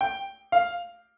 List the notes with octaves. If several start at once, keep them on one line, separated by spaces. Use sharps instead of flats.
G5
F5